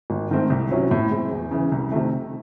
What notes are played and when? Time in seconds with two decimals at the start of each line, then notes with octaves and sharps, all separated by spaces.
0.10 G#1
0.31 G#2 D#3 A3 C4
0.50 C2
0.71 C3 F#3 C#4 E4
0.91 A2
1.11 G#3 C4 E4
1.31 E2
1.51 C#3 E3
1.72 C2
1.92 C3 D#3 A3